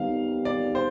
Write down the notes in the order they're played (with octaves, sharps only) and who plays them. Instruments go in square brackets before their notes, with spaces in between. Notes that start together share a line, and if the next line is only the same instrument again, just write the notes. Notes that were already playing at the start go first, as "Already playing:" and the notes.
Already playing: [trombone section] D#3 G3 B3 D#4 [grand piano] F5
[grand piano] D5
C5